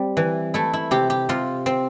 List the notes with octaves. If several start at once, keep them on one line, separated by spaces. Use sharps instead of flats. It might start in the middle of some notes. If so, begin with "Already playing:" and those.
Already playing: G3 C4
E3
A3 E4
E4
C3 G4
G4
C3 F4
C4